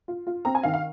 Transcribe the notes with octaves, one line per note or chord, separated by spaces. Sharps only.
F4
F4
C4 A#5
G#5
D#3 F5
F5